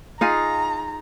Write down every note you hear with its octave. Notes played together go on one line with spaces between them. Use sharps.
D#4 F4 G#4 A#5